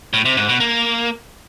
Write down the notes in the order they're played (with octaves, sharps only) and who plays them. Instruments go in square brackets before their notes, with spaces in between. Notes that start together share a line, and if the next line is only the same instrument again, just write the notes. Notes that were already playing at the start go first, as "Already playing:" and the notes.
[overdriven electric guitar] A2
C3
G#2
B2
A#3